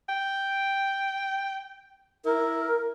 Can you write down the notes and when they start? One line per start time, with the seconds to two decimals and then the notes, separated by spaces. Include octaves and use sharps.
0.09 G5
2.25 E4 A#4